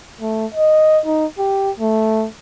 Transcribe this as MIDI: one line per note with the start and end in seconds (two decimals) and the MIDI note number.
0.21 0.46 57
0.54 1.00 75
1.06 1.26 63
1.39 1.71 67
1.79 2.26 57